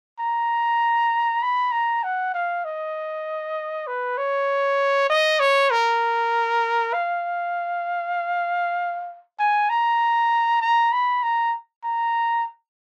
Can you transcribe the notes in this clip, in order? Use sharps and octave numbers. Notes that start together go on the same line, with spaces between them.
A#5
B5
A#5
F#5
F5
D#5
B4
C#5
D#5
C#5
A#4
F5
G#5
A#5
A#5
B5
A#5
A#5